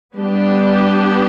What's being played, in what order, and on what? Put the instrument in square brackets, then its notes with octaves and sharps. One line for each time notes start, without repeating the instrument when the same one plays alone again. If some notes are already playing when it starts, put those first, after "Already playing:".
[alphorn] G3 [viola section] B3 D4 G4